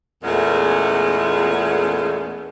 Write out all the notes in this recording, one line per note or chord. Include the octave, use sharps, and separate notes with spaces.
E2 A#2 G#3 A3 B3 C#4